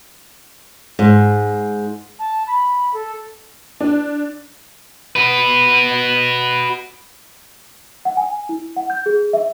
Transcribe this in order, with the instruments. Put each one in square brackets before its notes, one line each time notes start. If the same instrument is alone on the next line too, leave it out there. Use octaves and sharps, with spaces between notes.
[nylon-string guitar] G#2
[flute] A5
B5
A4
[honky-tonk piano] D4
[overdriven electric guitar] F#4 B4
[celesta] F#5
G#5
E4
F#5
G6
G#4
E5